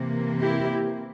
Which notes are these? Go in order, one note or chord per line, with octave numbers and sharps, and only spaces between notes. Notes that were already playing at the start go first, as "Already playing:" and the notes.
Already playing: C3 E3 A#3
E4 G4